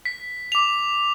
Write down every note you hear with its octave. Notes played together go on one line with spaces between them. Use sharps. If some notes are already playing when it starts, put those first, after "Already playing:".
B6
D6 F7